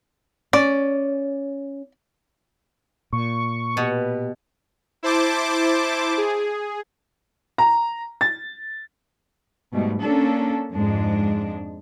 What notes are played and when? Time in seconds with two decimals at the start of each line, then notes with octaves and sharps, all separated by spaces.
0.53 C#4 D5
3.13 A#2 C#6
3.77 B2 G4 B4
5.03 E4 C5 A5 D6
6.17 G#4
7.58 A#5
8.21 A6
9.73 G#2 B2 G3 A3
10.02 A#3 C#4 D4 A4
10.73 F2 G#2 G#3 D4